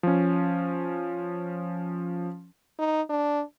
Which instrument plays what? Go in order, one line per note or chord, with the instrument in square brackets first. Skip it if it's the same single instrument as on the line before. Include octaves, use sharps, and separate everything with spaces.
[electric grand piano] F3 C#4
[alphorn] D#4
D4